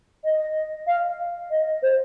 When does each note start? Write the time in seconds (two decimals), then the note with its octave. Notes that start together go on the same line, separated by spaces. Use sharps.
0.24 D#5
0.87 F5
1.50 D#5
1.82 C5